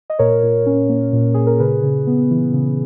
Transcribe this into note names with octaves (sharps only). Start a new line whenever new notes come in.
D#5
A#2 A#4 C#5
A#2
C#4
A#3
A#2
A#2 G#4
A#4
C#3 G#4 B4
C#3
B3
E3
C#3